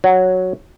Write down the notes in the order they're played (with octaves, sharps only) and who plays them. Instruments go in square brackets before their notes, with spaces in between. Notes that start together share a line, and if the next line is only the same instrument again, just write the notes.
[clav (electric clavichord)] F#3